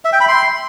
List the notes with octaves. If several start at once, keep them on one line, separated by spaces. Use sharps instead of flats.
E5
G5
B5
C6